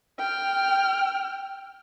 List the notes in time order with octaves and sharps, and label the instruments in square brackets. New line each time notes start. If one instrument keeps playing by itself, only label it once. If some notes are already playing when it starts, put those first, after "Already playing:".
[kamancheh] G5 F6